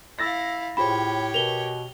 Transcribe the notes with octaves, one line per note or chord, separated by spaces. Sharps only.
E4 F5 E6 A6 A#6
A2 F4 G4 G#4 C5 C#5 B5
B2 A#4 B4 F7 G7